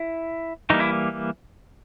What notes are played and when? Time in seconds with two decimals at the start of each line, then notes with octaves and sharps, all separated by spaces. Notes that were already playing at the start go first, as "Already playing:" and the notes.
Already playing: E4
0.70 E3 G3 A#3 D#4
0.80 E4